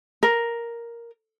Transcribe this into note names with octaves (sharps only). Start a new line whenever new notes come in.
A#4